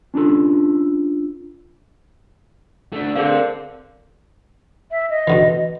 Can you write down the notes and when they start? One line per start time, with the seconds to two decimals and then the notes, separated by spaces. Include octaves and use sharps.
0.14 C#4 D4 F4 A4
2.93 A3 D4
3.16 D3 C4 G#4 A#4 F5
4.91 E5
5.10 D#5
5.27 B2 D3 E3